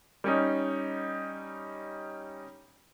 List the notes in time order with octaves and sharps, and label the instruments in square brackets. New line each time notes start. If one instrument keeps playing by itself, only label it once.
[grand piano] G3 C#4 D#4